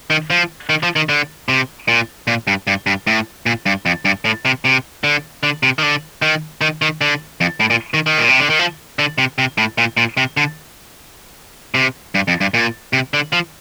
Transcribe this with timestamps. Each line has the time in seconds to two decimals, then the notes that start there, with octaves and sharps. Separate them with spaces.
0.10 D#3
0.30 F3
0.69 D#3
0.83 F3
0.96 D#3
1.09 D3
1.49 C3
1.88 A#2
2.27 A#2
2.47 G2
2.67 G2
2.87 G2
3.07 A2
3.46 A#2
3.66 G2
3.86 F2
4.05 G2
4.25 A2
4.45 C3
4.65 C3
5.04 D3
5.43 D3
5.63 C3
5.79 D#3
5.83 D3
6.22 D#3
6.61 D#3
6.82 D#3
7.01 D3
7.41 F2
7.60 A2
7.70 A#2
7.94 D#3
8.06 D#3
8.19 A#2
8.29 C3
8.39 D3
8.50 D#3
8.59 F3
8.99 D3
9.18 C3
9.38 C3
9.58 A2
9.78 A#2
9.97 A#2
10.17 C3
10.37 D3
11.75 C3
12.15 G2
12.28 F2
12.41 G2
12.54 A#2
12.93 C3
13.14 D3
13.33 F3